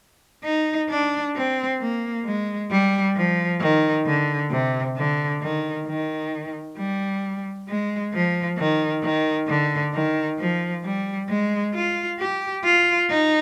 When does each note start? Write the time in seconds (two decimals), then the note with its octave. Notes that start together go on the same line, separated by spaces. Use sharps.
0.44 D#4
0.90 D4
1.36 C4
1.80 A#3
2.26 G#3
2.71 G3
3.16 F3
3.61 D#3
4.06 D3
4.51 C3
4.96 D3
5.42 D#3
5.86 D#3
6.77 G3
7.68 G#3
8.13 F3
8.58 D#3
9.03 D#3
9.48 D3
9.93 D#3
10.39 F3
10.83 G3
11.29 G#3
11.75 F4
12.19 G4
12.64 F4
13.09 D#4